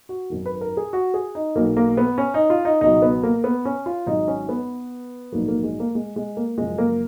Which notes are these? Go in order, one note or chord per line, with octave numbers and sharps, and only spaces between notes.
F#4
G#1 F#2 D#3
B4
A#4
G#4
F#4
G#4
D#4
B1 B2 F#3 A#3
A#3
B3
C#4
D#4
F4
D#4
C#2 B2 F#3 D#4
B3
A#3
B3
C#4
F4
G#1 G#2 F#3 D#4
C#4
B3
A#1 G#2 D#3 F#3 A#3
A#3
G#3
A#3
G#3
G#3
A#3
F#1 F#2 F3 G#3
A#3